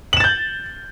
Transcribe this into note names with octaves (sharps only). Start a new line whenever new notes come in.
G6 A6 E7 F#7